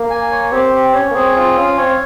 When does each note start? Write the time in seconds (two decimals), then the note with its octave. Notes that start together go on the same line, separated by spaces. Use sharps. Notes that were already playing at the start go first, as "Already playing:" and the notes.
Already playing: A#3
0.10 G#5
0.31 C#5
0.51 C4 G4
0.73 G4
0.94 C#4 C#5
1.11 A#3
1.15 C4 G#4
1.36 C4 F4
1.57 C#4 F5
1.78 C4 C#5